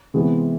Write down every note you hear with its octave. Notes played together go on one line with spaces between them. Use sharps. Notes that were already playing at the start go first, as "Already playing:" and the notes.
C3 E3 G#3 B3